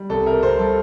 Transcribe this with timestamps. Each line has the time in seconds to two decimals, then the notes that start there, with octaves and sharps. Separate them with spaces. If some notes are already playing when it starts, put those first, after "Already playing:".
Already playing: G3
0.10 C2 A4
0.26 C3 A#4
0.43 C2 C5
0.59 G3 A4